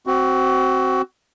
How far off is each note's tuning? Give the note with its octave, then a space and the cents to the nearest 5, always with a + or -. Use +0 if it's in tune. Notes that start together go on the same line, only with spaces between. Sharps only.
C4 +0 F#4 +20